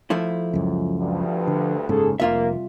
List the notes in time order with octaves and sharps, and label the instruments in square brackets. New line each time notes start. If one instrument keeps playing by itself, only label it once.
[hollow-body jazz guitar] F3 A3 E4
[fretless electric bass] C#2 F#2
[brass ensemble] D2 G2
[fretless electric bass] D3
[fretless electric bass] F#1 G#2 C#3 [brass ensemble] G#4 A4
[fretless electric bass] F1 [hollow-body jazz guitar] C2 F4 E5 [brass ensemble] A#3